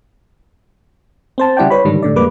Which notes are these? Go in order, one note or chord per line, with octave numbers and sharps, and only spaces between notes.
C4 C5 A5
C#3 G3 E4 D5 F#5 G5
B4 C#5 B5
G#2 D3 D#3 G3 D4
A2 D3 D5
F2 G3 G#3 A#3 B4 D6